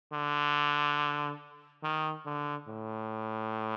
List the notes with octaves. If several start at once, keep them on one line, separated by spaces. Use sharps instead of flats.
D3
D#3
D3
A2